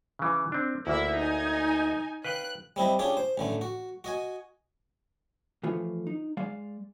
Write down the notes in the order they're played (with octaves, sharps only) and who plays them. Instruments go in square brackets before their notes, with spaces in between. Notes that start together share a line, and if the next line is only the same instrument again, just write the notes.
[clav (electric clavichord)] C#3 E3
C4 D4
[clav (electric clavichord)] D2 A#3 [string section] E4 E5
[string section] D#4 G#5
[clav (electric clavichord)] B4 F5 G5 [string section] F#6
[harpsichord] G3 C4 E4 D#5
C#4 D4 F4 G4 G#4
C5
A1 D3 A3
F#4
F#4 D#5 G#5
[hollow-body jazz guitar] E3 F3 A3 F4
D#4
G#3 D5 F5